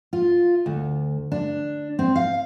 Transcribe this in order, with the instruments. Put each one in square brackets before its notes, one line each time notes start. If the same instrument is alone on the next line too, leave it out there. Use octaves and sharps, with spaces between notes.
[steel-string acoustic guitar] F4
D2
D4
C4
F5